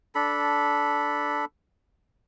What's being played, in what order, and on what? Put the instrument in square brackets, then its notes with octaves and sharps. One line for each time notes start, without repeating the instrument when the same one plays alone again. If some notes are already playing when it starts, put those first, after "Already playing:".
[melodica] D4 A4 B5